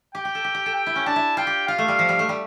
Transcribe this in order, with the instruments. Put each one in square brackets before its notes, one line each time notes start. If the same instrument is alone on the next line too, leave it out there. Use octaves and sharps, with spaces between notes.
[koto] G4 [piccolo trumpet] G5
[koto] G4
A4
G4
G4
A4
[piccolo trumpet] G5
[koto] E4
C#4
[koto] D4 [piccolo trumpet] A5
[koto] E4
[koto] F4 [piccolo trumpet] G5
[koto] G4
[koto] F4 [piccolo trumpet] F5
[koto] A3
G3
F3
G3
A3
G3